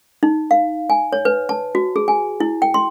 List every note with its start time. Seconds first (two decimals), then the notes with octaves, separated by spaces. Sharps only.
0.23 D#4
0.51 F5
0.90 G#5
1.13 C#5
1.25 B4
1.49 A5
1.75 F#4
1.96 G#4
2.08 G#5
2.40 E4
2.62 G5
2.74 C6